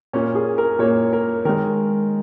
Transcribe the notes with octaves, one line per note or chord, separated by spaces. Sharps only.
A#2 A#3 C#4
G#4
A#4
A#2 A#3 C#5
A#4
D#3 G#3 A#4